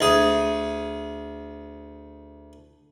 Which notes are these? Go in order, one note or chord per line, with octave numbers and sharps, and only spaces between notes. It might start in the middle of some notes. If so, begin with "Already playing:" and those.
D2 G#4